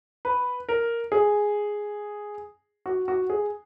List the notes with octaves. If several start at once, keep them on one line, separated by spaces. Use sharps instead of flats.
B4
A#4
G#4
F#4
F#4
G#4